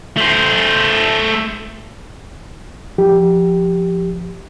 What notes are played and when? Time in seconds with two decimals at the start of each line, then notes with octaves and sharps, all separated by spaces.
0.17 A3 C5
2.98 F3 G4